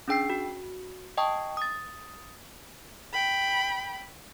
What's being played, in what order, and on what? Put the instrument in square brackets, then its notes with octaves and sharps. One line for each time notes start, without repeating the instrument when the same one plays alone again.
[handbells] C#4 D4 G#4 G5 E6 C7
F#4
D#5 G5 A5 C#6 D#6
D#6 A6
[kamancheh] G5 B5